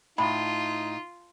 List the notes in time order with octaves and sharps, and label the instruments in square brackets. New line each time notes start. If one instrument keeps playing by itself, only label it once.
[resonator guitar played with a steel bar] A2 [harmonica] D#4 [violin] F4 [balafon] B5